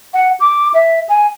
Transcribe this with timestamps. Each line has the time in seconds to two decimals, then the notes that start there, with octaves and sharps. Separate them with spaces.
0.14 F#5
0.40 D6
0.74 E5
1.09 G#5